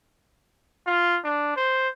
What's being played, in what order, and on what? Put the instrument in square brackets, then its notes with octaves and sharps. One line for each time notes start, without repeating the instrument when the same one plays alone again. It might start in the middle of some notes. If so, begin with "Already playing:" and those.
[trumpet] F4
D4
C5